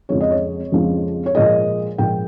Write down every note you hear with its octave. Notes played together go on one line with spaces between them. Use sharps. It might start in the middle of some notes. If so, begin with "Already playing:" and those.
F2 C#3 F3 G#3 C#5
D#5
C#5
F2 C#3 F3 G#3
C#5
A#2 F3 G#3 D#5
A#2 F3 G#3 G5